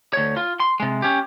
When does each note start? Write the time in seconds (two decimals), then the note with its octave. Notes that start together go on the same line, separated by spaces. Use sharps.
0.13 D2 C#5
0.37 F4
0.60 C6
0.80 C3 G#3
1.02 C#4 G4